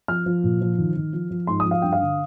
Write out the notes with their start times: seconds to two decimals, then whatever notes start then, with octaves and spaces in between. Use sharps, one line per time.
0.08 F3 F6
0.26 F3
0.44 A#2
0.61 F3
0.78 D#3
0.96 D#3
1.13 F3
1.31 F3
1.47 G#2 C6
1.60 F3 D#6
1.71 F5
1.82 G2 G5
1.93 F5
2.01 D3